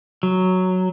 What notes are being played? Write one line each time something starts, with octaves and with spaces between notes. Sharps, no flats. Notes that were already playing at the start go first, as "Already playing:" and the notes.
F#3